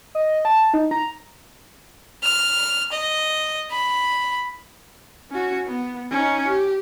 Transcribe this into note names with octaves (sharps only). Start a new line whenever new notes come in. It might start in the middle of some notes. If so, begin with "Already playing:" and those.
D#5
A5
D#4
A#5
F6
D#5
B5
C#4 F#4
B3
C#4 D#4
G4